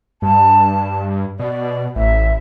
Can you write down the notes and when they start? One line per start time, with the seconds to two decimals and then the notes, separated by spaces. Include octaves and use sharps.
0.22 G2 A5
1.39 B2 D5
1.96 A1 E5